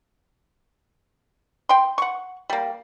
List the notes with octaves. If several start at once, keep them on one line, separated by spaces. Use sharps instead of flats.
G5 C6
F#5 C#6
G3 A#3